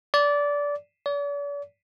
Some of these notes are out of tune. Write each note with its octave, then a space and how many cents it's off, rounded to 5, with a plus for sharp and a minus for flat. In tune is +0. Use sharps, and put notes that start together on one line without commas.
D5 -20
D5 -45